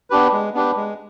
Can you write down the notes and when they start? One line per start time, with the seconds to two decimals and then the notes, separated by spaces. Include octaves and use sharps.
0.10 B3 D4 G4 B4
0.32 G#3
0.54 B3 D4 G4 B4
0.76 G#3